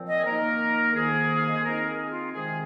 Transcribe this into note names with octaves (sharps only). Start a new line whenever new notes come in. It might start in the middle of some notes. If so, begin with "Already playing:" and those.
Already playing: A#2 F3 C4
D#5
G#4
D#3 A#3 D#4 A#4
F2 D#3 A#3 G#4
F5
D#5
C5
D#3 C4 D#4 A#4
G#4
F4
C3 D#3 G#3 C4 G#4